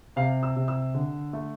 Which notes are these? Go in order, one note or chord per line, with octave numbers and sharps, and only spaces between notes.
C3 F5
E6
C3
E6
D3
A3